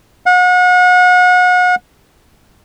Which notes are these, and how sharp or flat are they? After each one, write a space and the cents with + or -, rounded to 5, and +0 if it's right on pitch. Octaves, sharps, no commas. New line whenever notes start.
F#5 -35